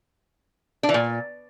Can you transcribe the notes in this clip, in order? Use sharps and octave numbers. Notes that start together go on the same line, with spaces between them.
D4
E3
A#2